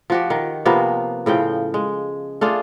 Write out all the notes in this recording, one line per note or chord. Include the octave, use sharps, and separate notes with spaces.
F3 F#4 G4
D#3
C3 F3 A#3 B3
A2 C#3 F3 G5
G#3
A3 D4 F4 G#4